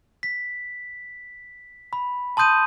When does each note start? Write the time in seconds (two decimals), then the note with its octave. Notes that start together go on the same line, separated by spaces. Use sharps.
0.23 B6
1.93 B5
2.37 A5 C6 D#6 G6 D#7